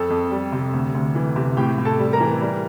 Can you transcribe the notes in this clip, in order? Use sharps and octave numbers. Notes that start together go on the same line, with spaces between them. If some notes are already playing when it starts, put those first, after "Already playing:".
Already playing: F2 A4 A5
F2
G3
C3
D2
D2
E3
C3
A2 G4 G5
A2
A4 A5
G3
A#4 A#5
E3
G3